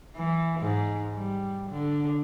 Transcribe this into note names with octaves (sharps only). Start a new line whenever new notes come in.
E3
G#2
G3
D3